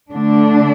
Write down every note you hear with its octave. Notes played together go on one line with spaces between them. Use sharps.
D3 A3 D4